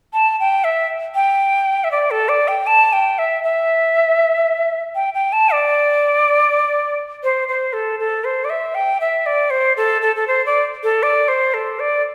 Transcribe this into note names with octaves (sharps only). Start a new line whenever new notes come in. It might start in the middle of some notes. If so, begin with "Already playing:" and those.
A5
G5
E5
G5
E5
D5
A4
D5
G5
A5
G5
E5
E5
G5
G5
A5
D5
C5
C5
A4
A4
C5
D5
E5
G5
E5
D5
C5
A4
A4
A4
C5
D5
A4
D5
C5
A4
D5